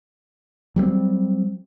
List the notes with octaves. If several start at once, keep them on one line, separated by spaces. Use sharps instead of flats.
F#3 G3 A#3 C4